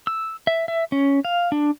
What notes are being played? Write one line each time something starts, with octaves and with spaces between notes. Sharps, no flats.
E6
E5
E5
C#4
F5
D4